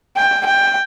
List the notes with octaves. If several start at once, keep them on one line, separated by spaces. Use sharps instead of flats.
G5
G5